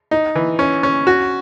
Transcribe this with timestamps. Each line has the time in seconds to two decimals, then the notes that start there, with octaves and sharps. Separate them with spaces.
0.11 D#4
0.35 E3
0.59 C#4
0.83 C#4
1.07 F#4